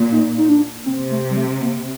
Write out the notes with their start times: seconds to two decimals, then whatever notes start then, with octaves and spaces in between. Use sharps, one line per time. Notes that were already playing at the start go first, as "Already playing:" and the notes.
Already playing: A#2
0.12 D#4
0.38 D#4
0.49 D4
0.86 C3 C4
1.11 A3
1.31 G3
1.37 A3
1.61 A#3